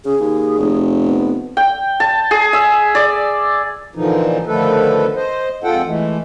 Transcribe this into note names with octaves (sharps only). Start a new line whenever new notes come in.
C#3 G#4
D#2
F1
B3
G5
A5
G#4
E5
D5
A#2 D3 E3 F3 D#4
D3 D#3 F3 A3 A4 B4
C5 D#5
F2 G#3 F4 A4 F#5 G5
E3 G#3 A3